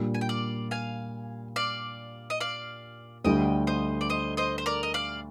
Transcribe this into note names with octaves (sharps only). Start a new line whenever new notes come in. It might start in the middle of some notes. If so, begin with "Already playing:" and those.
Already playing: A#2 G3 D4
G#5
G5
D5 F5
F5 G#5
D5 F5
D#5
D5 F5
D2 D3 G3 D#5 G5
C5 D#5
D5
C5 D#5
C5 D#5
C5
A#4 D5
D#5
D5 F5